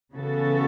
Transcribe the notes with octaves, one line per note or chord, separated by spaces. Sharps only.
C#3 E3 B3 F#4 A4